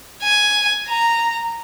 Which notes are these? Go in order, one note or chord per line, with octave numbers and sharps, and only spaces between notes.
G#5
A#5